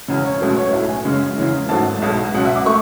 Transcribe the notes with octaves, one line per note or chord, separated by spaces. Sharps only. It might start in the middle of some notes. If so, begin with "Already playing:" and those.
E1 E2 C#3
C#5
C#2 B2 F#3 A3 B4
C#5
B1 A2 F#3 E5
G#5
F#2 C#3 G#3
E2 C#3 E3 G#3
G#1 G#2 F#3 A3 A5
B1 B2 G#3
C#2 B2 F#3 F#5
E5
D6
A3 C#6